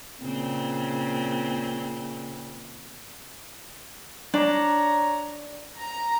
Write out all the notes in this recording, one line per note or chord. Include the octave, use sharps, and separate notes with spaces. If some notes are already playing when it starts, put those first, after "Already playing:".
A#2 C#3 C4
D4 C#5 A#5
A#5